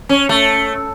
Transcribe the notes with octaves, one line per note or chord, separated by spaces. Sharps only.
C#4
A3